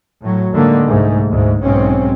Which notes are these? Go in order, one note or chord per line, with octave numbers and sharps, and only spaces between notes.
A2 F#3
A2 D3 D#3 G#3 A#3
C2 G#2 A3
D2 G#2
B1 G#2 C4 C#4